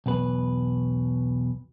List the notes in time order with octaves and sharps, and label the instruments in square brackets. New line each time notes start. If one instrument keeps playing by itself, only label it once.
[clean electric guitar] B1 E2 B2 B4